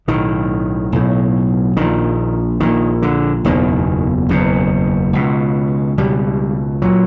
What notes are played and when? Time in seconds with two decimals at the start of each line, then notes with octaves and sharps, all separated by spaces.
0.08 B1 A2 D#3
0.92 B1 A2
1.77 A#1 A#2 D#3
2.60 A#1 A#2 D#3
3.02 D3
3.45 F#1 E2 B2 D#3
4.29 F#1 E2 B2
5.13 C#2 B2
5.98 C#2 B2 G3
6.82 A#2 F#3